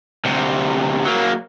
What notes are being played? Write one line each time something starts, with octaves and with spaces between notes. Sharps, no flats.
D2 C3
F#3 A#3